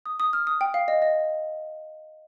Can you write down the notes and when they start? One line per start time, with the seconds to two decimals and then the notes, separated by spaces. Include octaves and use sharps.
0.06 D#6
0.20 D#6
0.33 F6
0.47 D#6
0.61 G5
0.74 F5
0.88 D#5
1.02 D#5